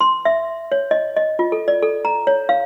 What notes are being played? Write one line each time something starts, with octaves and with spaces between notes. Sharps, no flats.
C6
E5
C#5
D#5
D#5
F4
A4
D5
A4
A#5
C#5
F5